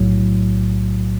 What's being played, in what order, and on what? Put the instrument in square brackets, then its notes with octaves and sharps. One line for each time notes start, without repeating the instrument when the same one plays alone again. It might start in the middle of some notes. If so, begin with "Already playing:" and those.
Already playing: [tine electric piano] B1 A2 F#3